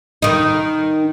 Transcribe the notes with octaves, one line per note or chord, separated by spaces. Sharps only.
D#3 D#4